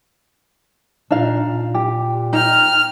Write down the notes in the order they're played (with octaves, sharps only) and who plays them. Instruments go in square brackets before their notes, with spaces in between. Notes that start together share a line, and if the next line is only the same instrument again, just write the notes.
[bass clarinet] A#2 [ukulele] D4 D#4 F5
[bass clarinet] A#2
[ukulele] G4
[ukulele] D#4 G5 [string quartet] F6